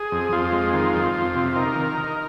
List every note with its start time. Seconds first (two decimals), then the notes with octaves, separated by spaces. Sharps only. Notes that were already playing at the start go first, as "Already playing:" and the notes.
Already playing: G#4
0.12 F2
0.32 F2 F4
0.52 G#3
0.73 D#3 F4
0.94 F2
1.15 F2
1.35 C3
1.56 D#4 A#4
1.76 D#3
1.97 D#4